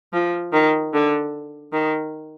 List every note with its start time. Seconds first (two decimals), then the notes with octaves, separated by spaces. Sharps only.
0.13 F3
0.53 D#3
0.94 D3
1.73 D#3